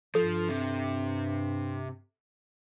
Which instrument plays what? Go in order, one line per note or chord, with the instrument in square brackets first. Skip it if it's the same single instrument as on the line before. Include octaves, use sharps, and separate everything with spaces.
[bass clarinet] G2 [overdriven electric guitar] F3 [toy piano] A4
[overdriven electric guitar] C3